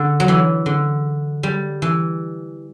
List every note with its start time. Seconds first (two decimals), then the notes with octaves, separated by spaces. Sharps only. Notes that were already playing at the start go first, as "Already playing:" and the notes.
Already playing: D3
0.20 F#3
0.28 E3
0.66 D3
1.43 G3
1.82 E3